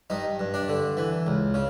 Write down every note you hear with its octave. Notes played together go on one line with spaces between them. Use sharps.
G2 D#4
G2
D4
D3
E3
C#2
C#3